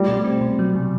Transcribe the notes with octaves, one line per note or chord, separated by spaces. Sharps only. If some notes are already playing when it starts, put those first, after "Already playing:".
Already playing: G3 A3
B2
C4
B2
F#3
C3